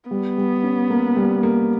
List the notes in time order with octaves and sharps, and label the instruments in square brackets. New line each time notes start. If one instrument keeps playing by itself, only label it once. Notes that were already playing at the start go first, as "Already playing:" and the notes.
[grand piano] G3 [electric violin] B3
[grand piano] G3
C#4
A#3
G3
A#3